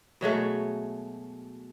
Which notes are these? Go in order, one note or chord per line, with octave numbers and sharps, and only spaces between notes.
B2 F#3 G#3 A3